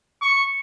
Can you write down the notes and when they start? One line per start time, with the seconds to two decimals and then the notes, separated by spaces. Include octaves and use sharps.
0.22 C#6